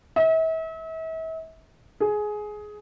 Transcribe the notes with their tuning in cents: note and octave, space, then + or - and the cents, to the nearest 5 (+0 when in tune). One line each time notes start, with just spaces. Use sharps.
E5 -40
G#4 +15